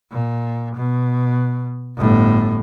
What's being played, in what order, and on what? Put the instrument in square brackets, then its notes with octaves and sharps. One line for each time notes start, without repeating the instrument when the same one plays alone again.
[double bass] A#2
B2
G1 A2